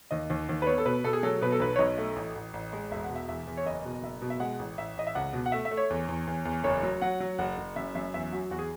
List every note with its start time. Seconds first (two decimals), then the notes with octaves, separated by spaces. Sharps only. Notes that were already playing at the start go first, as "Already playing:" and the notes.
0.11 D#2 D#5
0.30 D#2
0.49 D#2
0.62 B4
0.67 B3 C#5
0.78 A4
0.85 B2 B4
1.04 B2 A4
1.13 G#4
1.23 F#3 A4
1.41 B2 B4
1.52 A4
1.60 B1 B4
1.76 C#5
1.79 B1 D#5
1.98 A3
2.16 A1
2.35 A1
2.53 A1
2.73 G#3
2.91 E1 E5
3.04 F#5
3.09 B2
3.16 E5
3.28 E2 E5
3.47 E2
3.57 C#5
3.66 F#1 D#5
3.85 B2
4.02 F#1 E5
4.21 B2
4.30 E5
4.40 G#3 F#5
4.59 A1
4.78 A1 E5
4.97 A1 D#5
5.07 E5
5.15 C#2 F#5
5.33 B2
5.46 F#5
5.52 A3 E5
5.65 E5
5.71 A3
5.77 C#5
5.90 E2
6.08 E2
6.27 E2
6.45 E2
6.64 F#1 C#5
6.83 F#3
7.02 F#3 F#5
7.20 F#3
7.38 F#1 F#5
7.58 F#1
7.76 F#2 E5
7.95 F#2 E5
8.14 E2 E5
8.32 F#3 F#4
8.51 E2 F#4
8.59 G#4